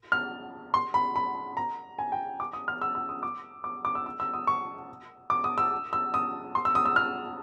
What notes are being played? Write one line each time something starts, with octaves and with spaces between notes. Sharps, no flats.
F6
C6
B5
B5
A#5
G#5
G5
D6
D#6
F6
E6
E6
D#6
D6
D6
D6
E6
E6
E6
D#6
C#6
D6
D#6
E6
E6
D#6
C6
E6
D#6
E6
F6